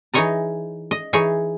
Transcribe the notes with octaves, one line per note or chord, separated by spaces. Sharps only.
E3 D#4 G#4 C#5 D#5 A#5
D#5
E3 D#4 G#4 C#5